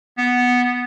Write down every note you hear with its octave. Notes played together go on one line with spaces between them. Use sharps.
B3